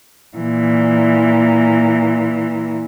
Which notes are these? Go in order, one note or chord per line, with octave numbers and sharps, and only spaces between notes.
A#2 E3